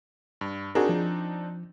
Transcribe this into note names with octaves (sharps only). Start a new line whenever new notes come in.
G2
C4 D4 D#4 F#4 G#4 A#4
F3